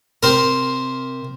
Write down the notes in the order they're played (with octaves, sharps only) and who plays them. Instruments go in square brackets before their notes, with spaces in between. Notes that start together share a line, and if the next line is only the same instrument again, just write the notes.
[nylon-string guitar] C3 [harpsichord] A#4 C5